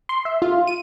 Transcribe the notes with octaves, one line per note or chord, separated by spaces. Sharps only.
C6
E5
F4
D#7